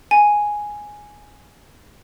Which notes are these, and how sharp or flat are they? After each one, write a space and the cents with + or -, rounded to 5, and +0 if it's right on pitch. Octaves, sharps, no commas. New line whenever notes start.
G#5 +0